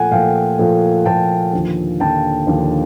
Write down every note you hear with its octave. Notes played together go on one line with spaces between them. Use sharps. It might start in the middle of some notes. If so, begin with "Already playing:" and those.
Already playing: A#2 F3 A3 F#5 G#5
A#2 F3 A3 F5 G5
A#2 F3 A3
A#2 F3 A3 G5 A5
D#2 D3 F3
D#2 D3 F3 G5 A5
D#2 D3 F3